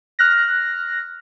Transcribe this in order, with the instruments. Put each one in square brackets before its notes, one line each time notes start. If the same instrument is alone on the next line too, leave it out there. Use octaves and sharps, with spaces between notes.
[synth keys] F6 F#6 A#6